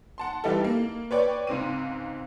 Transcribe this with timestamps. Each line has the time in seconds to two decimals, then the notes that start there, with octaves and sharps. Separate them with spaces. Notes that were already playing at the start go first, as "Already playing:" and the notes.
0.18 F#5 A5 C6
0.44 E3 G3 D#4 G4 A4
0.64 A#3
1.11 B4 C#5 D5 G5 C#6
1.47 C#2 G#2 C4 D#7